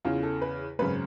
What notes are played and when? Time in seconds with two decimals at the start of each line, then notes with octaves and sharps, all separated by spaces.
0.05 E2 C#3 E3 F4
0.23 A4
0.42 B4
0.79 G#1 F#2 C#3 B4